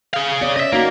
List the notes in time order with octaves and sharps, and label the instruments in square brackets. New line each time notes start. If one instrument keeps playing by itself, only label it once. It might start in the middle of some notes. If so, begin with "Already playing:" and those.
[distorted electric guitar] G#4 F5
[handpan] B3 C#5 D5
[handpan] C#4 [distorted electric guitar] D#5 E5
[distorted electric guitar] A#3 [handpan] D#4 F#4